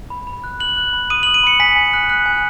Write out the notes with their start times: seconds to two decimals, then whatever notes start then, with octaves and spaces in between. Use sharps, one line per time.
0.10 B5
0.27 B5
0.44 F#6
0.60 F#6 F#7
0.77 F#6
0.93 B5
1.10 D#6 D#7
1.23 F#7
1.27 D#6
1.34 D#7
1.43 B5 C#7
1.60 G#5 B6
1.76 G#5
1.94 F#6
2.10 F#6
2.26 G#5